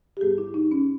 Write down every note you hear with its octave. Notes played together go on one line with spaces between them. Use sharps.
G4
G#2 G3 B3 G#4
E4
D#4
C#4